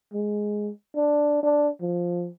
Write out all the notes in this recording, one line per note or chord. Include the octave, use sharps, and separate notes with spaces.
G#3
D4
D4
F3